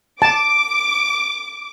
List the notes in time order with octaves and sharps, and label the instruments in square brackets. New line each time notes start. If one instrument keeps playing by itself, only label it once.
[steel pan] A5 [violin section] D6